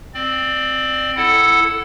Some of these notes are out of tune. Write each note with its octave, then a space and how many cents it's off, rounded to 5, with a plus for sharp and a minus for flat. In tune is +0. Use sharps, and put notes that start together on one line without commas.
C4 +0 D5 +25
E4 +0 A4 +0 F#5 +0